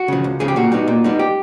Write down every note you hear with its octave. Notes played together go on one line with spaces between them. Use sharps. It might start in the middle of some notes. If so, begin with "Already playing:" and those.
Already playing: F#4
C#3 F3
C#2
C#3 F3 G#4
G4
A#2 F#4
G3 B3 D#4
A#2
G3 B3 D#4
G4